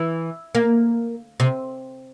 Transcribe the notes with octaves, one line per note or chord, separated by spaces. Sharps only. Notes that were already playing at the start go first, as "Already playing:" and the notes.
Already playing: E3
A#3
C3